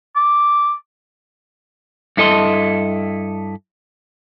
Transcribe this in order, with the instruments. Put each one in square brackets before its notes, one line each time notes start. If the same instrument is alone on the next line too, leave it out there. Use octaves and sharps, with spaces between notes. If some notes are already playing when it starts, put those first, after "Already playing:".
[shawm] D6
[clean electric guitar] G2 E4 A4 D#5 A5 C6